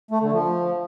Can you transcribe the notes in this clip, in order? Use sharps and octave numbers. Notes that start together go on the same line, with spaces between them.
A3
D3
F3